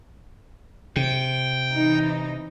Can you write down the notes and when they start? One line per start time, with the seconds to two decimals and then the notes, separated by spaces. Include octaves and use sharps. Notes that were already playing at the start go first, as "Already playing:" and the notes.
0.96 C3 G5
1.73 E3 D#4